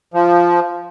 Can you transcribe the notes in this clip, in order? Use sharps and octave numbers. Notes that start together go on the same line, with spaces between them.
F3